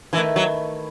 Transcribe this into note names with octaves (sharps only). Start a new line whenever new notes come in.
D#3 E3 A3 E4 B4
F#3